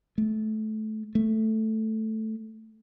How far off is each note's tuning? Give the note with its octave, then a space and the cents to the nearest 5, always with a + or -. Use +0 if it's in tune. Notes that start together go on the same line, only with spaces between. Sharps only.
A3 -20
A3 +0